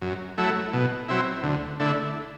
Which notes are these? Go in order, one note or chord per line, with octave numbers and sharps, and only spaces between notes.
F#2
F#3 A3 E4
B2
F#3 C4 E4
D2
D3 A3 E4